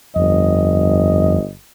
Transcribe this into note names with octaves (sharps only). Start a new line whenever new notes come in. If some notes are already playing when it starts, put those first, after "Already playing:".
G1 F2 D#5